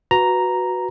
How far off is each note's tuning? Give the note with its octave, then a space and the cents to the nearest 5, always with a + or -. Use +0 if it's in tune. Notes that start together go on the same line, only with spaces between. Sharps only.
F#4 -5 B4 +0 A#5 +0